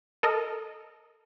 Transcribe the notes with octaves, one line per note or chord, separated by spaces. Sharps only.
A4 A#4 D#5